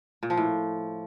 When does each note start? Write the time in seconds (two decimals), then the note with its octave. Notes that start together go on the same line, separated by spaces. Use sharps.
0.23 A#2
0.30 F3
0.37 A2